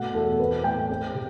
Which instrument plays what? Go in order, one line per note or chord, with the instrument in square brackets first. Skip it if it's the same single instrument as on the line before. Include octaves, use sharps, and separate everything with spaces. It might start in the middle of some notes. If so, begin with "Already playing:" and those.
Already playing: [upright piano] B2 A3 F#5
E2 A4
C4 B4
A2 G5
C4
C3